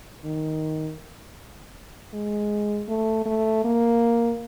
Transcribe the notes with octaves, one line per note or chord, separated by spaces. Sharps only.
D#3
G#3
A3
A3
A#3